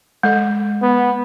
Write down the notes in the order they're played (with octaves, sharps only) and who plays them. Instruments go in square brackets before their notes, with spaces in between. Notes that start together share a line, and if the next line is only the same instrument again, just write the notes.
[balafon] G#3 A4 D#5
[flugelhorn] B3